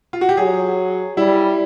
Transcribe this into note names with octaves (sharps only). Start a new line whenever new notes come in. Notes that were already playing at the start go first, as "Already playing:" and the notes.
F4
F#4
G4
F#3 G#4
G3 E4